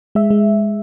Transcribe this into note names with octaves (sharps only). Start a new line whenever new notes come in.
G#3 E5
G#3